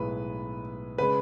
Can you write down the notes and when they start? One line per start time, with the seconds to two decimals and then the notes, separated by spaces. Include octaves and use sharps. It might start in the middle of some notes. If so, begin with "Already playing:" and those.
Already playing: B1 A2 G#3 B4
0.98 C#3 G#3 B4